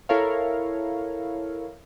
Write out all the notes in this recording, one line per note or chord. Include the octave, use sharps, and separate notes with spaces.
E4 A4 A#4 C#5 F5